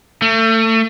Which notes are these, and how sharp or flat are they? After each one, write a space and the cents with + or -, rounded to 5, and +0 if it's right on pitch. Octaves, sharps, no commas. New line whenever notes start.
A3 +30